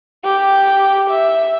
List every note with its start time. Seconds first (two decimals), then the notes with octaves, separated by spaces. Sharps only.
0.24 G4
1.10 E5